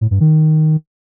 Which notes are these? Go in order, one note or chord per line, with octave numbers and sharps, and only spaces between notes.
A2
G2
D#3